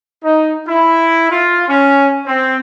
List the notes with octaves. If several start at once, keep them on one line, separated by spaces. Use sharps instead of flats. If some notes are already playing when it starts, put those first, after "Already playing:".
D#4
E4
F4
C#4
C4